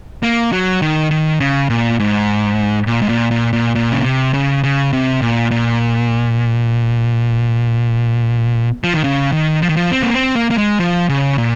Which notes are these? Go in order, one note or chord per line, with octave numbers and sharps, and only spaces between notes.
A#3
F#3
D#3
D#3
C#3
A#2
G#2
A#2
G#2
A#2
A#2
A#2
A#2
C#3
C3
C#3
C#3
C3
A#2
A#2
F3
D#3
C#3
D#3
F3
D#3
F3
C4
A#3
C4
A#3
A#3
G#3
F3
C#3
A#2